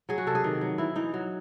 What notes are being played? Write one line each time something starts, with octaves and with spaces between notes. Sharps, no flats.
F#3 G#4
F#4
C3 A4
G#4
D#3
F#3
E3 E4
E3 D#4
F#3